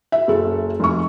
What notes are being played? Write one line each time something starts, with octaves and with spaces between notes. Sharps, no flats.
E5
F#1 A4
F1 C#6